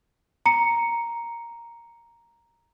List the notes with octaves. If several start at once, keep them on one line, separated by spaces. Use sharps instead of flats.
A#5 C#7